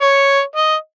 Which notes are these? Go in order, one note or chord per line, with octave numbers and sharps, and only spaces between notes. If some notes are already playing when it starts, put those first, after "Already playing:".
C#5
D#5